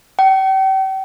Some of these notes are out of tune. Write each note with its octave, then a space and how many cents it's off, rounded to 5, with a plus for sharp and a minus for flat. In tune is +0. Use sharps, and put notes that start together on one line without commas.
G5 -35